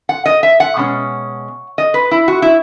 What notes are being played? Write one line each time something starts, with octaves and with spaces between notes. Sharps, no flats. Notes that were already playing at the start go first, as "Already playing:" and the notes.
F#5
D#5
E5
F#5
B2 G#3 C#4
D#5
B4
E4
F#4
E4